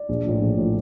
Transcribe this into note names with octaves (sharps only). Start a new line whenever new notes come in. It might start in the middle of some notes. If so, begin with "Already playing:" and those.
Already playing: D5
A#1
A2 F3
A#1
A2 F3